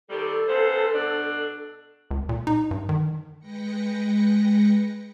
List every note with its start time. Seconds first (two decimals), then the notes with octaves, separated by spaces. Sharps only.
0.10 C3 D#3 G3 A4
0.48 C#3 B3 C5
0.94 B2 D4
2.11 C#2
2.29 A#2
2.47 D#4
2.71 G2
2.89 D#3
3.39 G#3 B4 G5 A#6 C#7